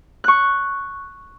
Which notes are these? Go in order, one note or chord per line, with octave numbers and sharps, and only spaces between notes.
C#6 F#6